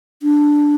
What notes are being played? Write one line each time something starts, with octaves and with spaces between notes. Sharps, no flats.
D4